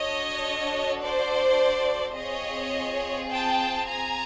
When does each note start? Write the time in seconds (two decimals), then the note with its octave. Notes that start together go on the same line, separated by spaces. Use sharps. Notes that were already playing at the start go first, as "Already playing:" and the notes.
Already playing: D4 F#4 A4 C#5 D#5
1.03 C5 D5
2.17 C4 F4 G#4 C#5 D#5
3.30 G5 A5
3.87 G#5 A#5